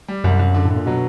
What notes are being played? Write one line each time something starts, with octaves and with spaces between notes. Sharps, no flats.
G3
C2 F#2
C2
D3
A2
D3
A#2
B2 F#3